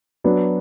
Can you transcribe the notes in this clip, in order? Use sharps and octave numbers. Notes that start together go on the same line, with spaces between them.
F#3 B3 D4